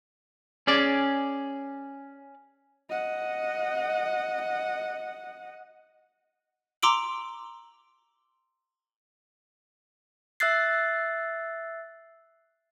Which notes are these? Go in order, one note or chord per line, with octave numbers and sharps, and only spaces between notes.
C#4 G#4 D5
D#5 F#5
A#5 C6 D6 E6 D7 F#7
E5 E6 F#6 A6 C7